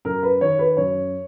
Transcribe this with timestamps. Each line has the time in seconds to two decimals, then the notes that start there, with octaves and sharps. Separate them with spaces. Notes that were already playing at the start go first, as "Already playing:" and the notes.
0.05 F#2 A#4
0.23 B4
0.41 D#3 C#5
0.59 B4
0.77 F#2 C#5